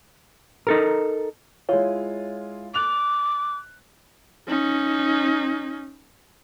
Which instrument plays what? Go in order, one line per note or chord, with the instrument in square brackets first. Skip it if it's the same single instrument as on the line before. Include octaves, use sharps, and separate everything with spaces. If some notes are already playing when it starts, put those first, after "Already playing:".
[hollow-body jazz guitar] D#4 A4 A#4
[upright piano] G#3 E4 F4 [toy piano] C#5
[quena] D6 [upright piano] F#6 F7
[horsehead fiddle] C#4 D#4